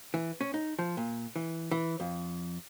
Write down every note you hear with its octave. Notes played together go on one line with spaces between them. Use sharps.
E3
C#4
D#4
F3
A#2
E3
E3
F2